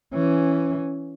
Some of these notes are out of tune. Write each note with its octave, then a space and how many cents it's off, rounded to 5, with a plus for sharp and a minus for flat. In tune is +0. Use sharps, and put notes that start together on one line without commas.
E3 +10 C#4 +0